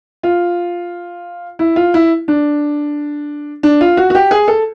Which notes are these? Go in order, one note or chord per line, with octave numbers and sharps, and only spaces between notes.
F4
E4
F4
E4
D4
D4
F4
F#4
F#4
G4
G#4
A4